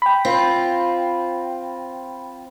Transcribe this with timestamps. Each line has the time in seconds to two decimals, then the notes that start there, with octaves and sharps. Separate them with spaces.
0.02 G5 B5
0.25 C4 F4